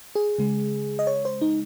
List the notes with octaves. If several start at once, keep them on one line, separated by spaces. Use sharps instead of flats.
G#4
C#3 G#3
D#5
C#5
C5
D#4